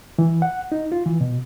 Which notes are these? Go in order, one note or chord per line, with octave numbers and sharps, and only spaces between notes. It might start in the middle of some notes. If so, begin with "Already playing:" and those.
E3
F#5
D#4
F4
E3
B2